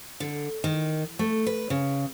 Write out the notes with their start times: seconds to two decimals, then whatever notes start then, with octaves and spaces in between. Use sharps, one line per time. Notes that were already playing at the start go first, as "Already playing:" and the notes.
0.20 D3
0.64 D#3
1.19 A3
1.46 B4
1.70 C#3